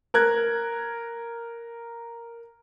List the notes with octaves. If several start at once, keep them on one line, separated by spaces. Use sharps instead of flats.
A#4 F#6 G#6